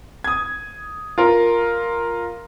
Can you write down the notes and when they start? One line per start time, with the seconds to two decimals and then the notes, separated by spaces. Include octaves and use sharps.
0.24 D#6 G#6
1.18 F4 A#4